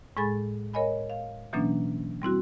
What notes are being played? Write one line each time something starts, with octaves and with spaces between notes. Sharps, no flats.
A2 G#3 G#4 G#5 B5 A6
A#4 C#5 D#5 G#5 B5
F5
B2 E3 F#3 A#3 C#4 D4
G3 C4 E4 F#4